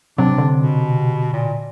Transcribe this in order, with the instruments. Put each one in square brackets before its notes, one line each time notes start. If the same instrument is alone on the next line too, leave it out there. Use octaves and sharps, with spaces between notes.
[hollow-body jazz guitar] C3 [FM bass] F#3 [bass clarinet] D4
[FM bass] D3
[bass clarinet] B2
A#2